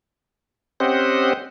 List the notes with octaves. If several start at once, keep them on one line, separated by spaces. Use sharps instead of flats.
C4 C#4 G4 C5 D#5 F#5